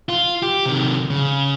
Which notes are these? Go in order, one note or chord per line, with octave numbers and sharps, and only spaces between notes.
F4
G4
C3 D#3
C#3